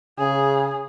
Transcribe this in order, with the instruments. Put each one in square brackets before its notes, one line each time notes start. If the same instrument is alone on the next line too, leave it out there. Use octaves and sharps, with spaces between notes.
[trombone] C#3 [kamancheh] G#4